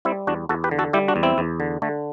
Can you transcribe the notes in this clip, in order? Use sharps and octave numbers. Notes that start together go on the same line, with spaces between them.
G3 C4 E4
E2 D4 F#4
E2 F#4 A4
G4 B4
D3
F#4 A4
G3 E4 G4
D4 F#4
E2
C4 E4
E2
D3
D3 A3